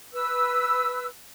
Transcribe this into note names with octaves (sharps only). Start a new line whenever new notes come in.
B4 E6